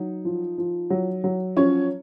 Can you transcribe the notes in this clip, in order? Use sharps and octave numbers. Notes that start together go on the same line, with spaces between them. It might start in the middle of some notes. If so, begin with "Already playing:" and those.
Already playing: F#3 D#4
F3
F3
F#3
F#3
F3 C#4 C#5